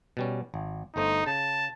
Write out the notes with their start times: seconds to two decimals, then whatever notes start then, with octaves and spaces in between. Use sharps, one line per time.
0.17 B2 G3 C#4
0.54 G#1
0.96 G1 A3 D#4 C5
1.27 C#3 A5